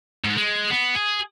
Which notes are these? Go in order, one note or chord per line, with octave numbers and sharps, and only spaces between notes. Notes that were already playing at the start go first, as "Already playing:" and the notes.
G#2
G#3
B3
G#4